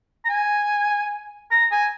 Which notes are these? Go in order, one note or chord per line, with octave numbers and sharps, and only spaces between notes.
A#5
G#5
A#5
G#5